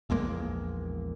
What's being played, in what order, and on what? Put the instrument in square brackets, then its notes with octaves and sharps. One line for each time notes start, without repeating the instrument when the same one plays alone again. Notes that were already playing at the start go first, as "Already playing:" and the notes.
[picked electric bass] A#1 E2 G#3 A#3